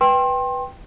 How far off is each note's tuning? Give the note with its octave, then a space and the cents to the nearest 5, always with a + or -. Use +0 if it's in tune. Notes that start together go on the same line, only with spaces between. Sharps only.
B4 +0 G5 +0 C6 +30